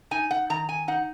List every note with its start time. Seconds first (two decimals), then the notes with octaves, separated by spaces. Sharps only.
0.11 D#4 G#5
0.31 F#5
0.50 D#3 A#5
0.69 G#5
0.88 D#4 F#5